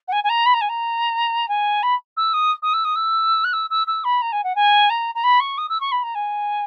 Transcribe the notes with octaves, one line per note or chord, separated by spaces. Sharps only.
F#5
G#5
G#5
A#5
B5
A#5
G#5
A#5
G#5
B5
E6
D#6
D#6
E6
D#6
E6
F#6
E6
E6
E6
B5
A#5
G#5
F#5
G#5
A#5
A#5
B5
C#6
D#6
E6
C#6
B5
A#5
G#5